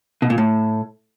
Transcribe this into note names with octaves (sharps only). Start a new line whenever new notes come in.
B2
A#2
A2